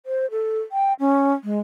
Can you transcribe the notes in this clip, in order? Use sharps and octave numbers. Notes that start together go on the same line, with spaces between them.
C5
A4
G5
C#4
G#3